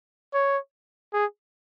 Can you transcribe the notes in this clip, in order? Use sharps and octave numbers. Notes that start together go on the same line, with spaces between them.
C#5
G#4